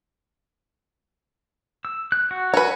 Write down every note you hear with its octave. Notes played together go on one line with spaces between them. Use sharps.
E6
F#6
F#4
F#4 B4 C#5 G#5